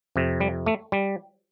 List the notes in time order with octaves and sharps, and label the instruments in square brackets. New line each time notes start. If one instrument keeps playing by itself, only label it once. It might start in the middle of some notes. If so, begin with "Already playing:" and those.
[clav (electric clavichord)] F2 C3
G3
A3
G3